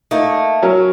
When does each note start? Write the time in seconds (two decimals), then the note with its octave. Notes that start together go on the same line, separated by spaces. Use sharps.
0.11 A3 A#3 D#4
0.62 F#3 C#4 A#4